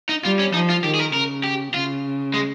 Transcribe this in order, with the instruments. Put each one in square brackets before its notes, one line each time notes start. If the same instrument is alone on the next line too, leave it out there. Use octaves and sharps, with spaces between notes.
[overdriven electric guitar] D#4
[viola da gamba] G3 [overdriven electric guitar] F4
[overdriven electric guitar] C#4
[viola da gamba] F3 [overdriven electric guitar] D#4
[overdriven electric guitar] F4
[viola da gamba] D#3 [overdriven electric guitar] G4
[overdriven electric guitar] G#4
A#4
[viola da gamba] C#3 [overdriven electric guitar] A#4
[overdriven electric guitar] G4
[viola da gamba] C#3 [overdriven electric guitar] F4
[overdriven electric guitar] G#3